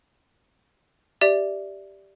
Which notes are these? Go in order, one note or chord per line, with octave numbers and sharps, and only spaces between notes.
G4 D5 E5